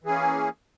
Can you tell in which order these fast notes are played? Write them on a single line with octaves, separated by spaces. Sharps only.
E3 G#4 C#4 A#3